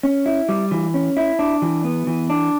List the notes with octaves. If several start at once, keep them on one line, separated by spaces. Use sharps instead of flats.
C#4
E4
G3
E3
C#4
E4
D4
E3
B3
E3
D4